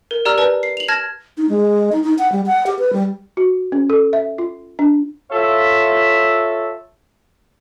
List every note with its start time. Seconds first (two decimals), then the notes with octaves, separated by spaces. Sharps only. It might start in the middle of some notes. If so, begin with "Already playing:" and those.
0.11 A#4
0.25 G4 D5 A#5 E6 F6
0.38 B4 D5 A5
0.63 C7
0.77 F7 F#7
0.88 A5 F6 G#6 A#6 E7
1.38 D#4
1.49 G#3
1.92 D#4
2.04 D#4
2.19 F#5
2.32 G3
2.46 F#5
2.67 G4
2.79 B4
2.93 G3
3.37 F#4
3.72 C#4
3.90 A4
4.13 E5
4.38 F4
4.79 D4
5.30 F4 A4 C#5 E5